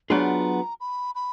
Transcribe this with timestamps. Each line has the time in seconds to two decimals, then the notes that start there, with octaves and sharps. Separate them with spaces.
0.10 F#3 B3 D4 F4 G#4 A#5
0.80 B5
1.15 B5